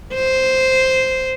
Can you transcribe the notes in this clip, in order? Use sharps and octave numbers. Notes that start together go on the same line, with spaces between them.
C5